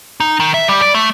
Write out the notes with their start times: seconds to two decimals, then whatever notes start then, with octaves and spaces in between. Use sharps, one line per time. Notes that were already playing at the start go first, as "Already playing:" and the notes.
0.20 D#4
0.40 D#3
0.54 E5
0.68 G3
0.82 D5
0.95 A3